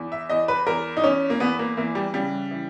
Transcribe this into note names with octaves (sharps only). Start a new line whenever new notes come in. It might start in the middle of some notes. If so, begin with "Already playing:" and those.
Already playing: E2
E5
E2 D#5
B4
E2 A#4
D#4
E2 C#4
A#3
E2 B3
A#3
E3 A#3
G3
C#3 G3
E3